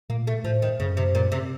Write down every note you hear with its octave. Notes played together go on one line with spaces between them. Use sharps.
A#2 A#3
A3
A2 F3
D#3
F#2 C#3
C3
A#2
C3